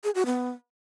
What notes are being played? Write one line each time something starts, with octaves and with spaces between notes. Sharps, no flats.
G#4
F#4
B3